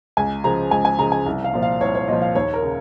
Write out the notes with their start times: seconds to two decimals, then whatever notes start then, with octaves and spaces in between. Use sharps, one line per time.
0.17 C#2 G#5
0.44 C#3 F3 A#5
0.71 C#2 G#5
0.85 G#5
0.98 C#3 F3 A#5
1.12 G#5
1.26 C2
1.44 F5
1.54 A#2 F3
1.63 F5
1.81 C2 C#5
1.95 C#5
2.08 A#2 F3 D#5
2.22 F5
2.35 D#2 C#5
2.54 A#4
2.63 C#3